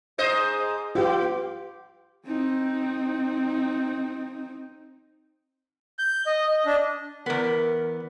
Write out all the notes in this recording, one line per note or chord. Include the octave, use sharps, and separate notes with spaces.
G#2 C5 D#5
B3 F4 G4
C4 D#4
G6
D#5
D#5
D4
E2 B3 A#4